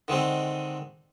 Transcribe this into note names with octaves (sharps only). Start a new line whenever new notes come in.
D3 D#3 G#3 C4